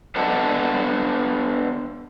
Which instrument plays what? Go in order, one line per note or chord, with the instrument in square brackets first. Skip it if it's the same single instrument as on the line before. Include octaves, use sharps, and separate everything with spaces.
[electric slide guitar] B3 D4 A4 D#5 F#5 A5